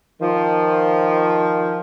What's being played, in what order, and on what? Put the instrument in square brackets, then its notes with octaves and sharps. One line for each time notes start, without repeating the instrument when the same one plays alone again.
[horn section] D#3 F3